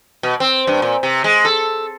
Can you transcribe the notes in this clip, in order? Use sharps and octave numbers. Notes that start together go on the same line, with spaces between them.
B2
C4
G2
A#2
C3
G#3
A4